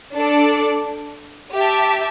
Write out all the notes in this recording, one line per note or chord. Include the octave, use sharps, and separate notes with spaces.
D4 A4 D5
G4 E5 A5